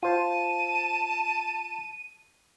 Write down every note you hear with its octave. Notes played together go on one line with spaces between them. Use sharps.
F4 C5 A5 D#7